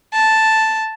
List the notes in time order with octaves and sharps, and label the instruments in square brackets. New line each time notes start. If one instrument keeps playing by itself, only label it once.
[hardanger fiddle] A5